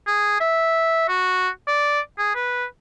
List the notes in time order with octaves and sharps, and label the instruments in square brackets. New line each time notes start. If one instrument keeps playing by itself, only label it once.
[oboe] G#4
E5
F#4
D5
G#4
B4